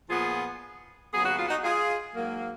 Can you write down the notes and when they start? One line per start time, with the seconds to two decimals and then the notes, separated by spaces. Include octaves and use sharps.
0.10 A#2 F3 B3 F4 G#4
1.12 D#2 C#3 F#3 B3 G#4
1.24 F#4
1.37 F4
1.48 D#4 F#4
1.64 F4 G#4
2.15 G#2 F#3 A#3